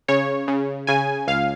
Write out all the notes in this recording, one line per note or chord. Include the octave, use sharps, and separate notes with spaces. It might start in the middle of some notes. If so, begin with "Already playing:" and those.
C#3 C#5
C#3
C#3 G#5
C#2 F5